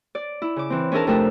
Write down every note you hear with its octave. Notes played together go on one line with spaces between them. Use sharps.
D5
E4
C#3 D6
E3 C4
C#4 D4 E4 G#4 A#4 A5
F2 C3 A3 A#4 E5 A#5